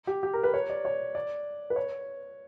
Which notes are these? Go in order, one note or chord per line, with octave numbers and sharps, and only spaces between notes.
G4
G4
A#4
B4
C#5
D5
C#5
D5
B4
C#5